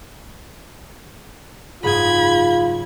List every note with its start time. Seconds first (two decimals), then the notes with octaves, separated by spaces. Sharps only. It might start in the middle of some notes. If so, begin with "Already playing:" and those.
1.83 F#1 G#2 F4 G#4 B5 G#6